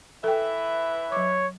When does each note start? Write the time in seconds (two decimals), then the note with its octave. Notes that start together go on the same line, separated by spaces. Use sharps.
0.24 E3 A4 B4 E5 G5
1.12 F#3 C#5 D6